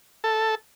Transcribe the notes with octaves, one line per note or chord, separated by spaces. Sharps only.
A4